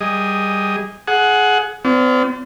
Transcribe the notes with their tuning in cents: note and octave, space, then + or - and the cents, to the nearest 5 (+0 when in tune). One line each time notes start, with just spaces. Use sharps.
G3 +0 G#4 -15 D#5 +5
G#4 +25 F#5 +0
C4 -45 F4 +0 D5 -45